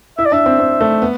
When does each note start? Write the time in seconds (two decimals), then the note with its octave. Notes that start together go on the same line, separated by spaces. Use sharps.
0.18 E4 E5
0.25 D5
0.32 D4 E5
0.46 C4
0.59 C4
0.81 A3
1.02 B3